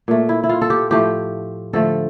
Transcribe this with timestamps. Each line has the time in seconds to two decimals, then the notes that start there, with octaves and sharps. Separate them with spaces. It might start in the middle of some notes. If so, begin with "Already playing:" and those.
0.08 A#2 A3
0.29 E4
0.44 E4
0.49 F4
0.61 A4
0.70 G4
0.91 A2 F3 A3 G4
1.73 D3 F3 A3 A4